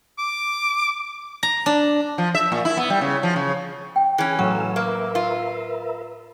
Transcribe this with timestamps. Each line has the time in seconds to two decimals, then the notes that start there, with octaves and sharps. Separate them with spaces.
0.18 D6
1.43 A#5
1.66 D4
2.18 F3
2.35 E5
2.52 A#2
2.65 E4
2.77 B3
2.90 G3
3.01 C#3
3.23 F3
3.36 C#3
3.96 G5
4.18 E3 C#4 G#4
4.39 A2 F#3 A4 F5 F#5 E6
4.76 A#3 A#4 B4 E5
5.15 F4